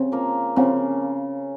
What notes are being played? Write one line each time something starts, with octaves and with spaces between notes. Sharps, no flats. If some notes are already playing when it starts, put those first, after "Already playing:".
Already playing: C#3 C4
F3 A#3
C#3 C4